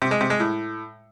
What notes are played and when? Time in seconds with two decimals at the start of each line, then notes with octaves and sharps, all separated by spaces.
0.02 C3
0.11 G#3
0.21 C3
0.30 G#3
0.40 A2